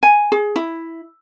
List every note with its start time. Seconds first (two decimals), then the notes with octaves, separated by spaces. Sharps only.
0.03 G#5
0.32 G#4
0.56 E4